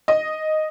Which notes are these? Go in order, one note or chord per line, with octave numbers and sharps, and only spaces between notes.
D#5